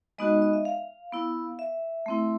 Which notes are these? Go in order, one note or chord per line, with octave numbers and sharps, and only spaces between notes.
G#3 B3 D#4 F#4 D#5
D#5
E5
F5
B3 E4
E5
A3 C4 E4